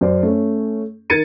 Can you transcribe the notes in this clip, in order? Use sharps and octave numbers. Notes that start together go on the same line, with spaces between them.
F#2 C5 D5
A3 C#4
D#3 A#4 G#6 A6 C#7 D#7